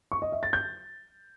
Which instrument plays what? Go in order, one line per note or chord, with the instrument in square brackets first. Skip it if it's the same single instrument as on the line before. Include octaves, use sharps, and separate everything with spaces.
[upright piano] C#6
D#5
E5
A6
G6